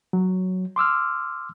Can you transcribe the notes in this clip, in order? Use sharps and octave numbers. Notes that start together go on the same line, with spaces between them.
F#3
C6 D6 E6 F6